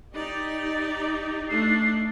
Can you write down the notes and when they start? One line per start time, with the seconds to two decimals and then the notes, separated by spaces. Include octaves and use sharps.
0.13 D#4 G4 D5
1.49 A3 D4 C7